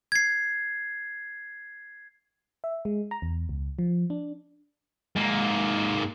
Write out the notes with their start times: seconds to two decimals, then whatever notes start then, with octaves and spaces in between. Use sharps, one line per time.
0.12 G#6 C7
2.64 E5
2.85 G#3
3.11 A#5
3.22 E2
3.49 C#2
3.79 F3
4.10 D4
5.16 G#2 A#3